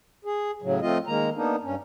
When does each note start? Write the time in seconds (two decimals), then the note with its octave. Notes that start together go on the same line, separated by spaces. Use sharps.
0.25 G#4
0.62 A2 C#3 F#3
0.82 F3 A3 C4 F4 D#5
1.07 D#3 G#3 A#3 A#5
1.36 A#3 B3 D4 D#4
1.64 G2 C#4